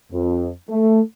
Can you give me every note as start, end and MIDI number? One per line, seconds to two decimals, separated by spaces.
0.12 0.49 41
0.69 1.00 57